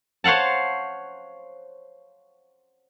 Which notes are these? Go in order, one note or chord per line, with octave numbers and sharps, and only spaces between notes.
C5 C#5 F5 F#5 A5